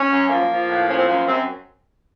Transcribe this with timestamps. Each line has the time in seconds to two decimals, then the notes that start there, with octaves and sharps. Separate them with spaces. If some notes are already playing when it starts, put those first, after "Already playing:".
Already playing: C#4
0.11 F#2
0.29 F3 A#3
0.50 F3
0.69 A2
0.88 F3 C#4
0.98 C4
1.07 F#2 A#3
1.27 F#2 C4